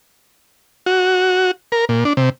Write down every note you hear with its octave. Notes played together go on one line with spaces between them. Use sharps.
F#4
A#4
A#2
D4
C3